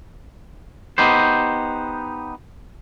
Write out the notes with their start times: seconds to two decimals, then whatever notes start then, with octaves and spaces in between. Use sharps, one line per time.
0.98 B3 D#4 G4 C5